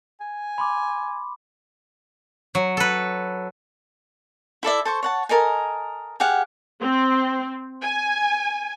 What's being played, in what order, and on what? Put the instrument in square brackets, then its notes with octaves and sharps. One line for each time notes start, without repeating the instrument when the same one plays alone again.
[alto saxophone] G#5
[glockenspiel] B5 C6 D6
[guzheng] F#3
A4 B4
[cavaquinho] E4 A4 D5 E5
A4 C5 C#6
C#5 F#5 A5
A4 A#4 D#5 G#5
G4 G#4 F5 F#5
[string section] C4
G#5